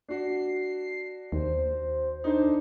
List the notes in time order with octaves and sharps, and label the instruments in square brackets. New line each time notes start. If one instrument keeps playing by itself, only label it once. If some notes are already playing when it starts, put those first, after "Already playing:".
[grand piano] D4 F#4 [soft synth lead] C7
[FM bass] D#2 [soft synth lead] C5
[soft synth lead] D4 [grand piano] D#4 A4 C5